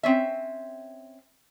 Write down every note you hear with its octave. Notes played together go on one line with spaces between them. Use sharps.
C4 C#4 E5